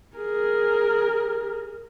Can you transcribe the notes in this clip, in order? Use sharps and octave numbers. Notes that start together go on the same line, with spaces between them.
G#4 A#4